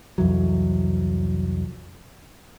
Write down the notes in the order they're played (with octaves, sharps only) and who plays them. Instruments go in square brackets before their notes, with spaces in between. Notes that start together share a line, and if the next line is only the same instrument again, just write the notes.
[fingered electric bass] C2 F2 E3 F#3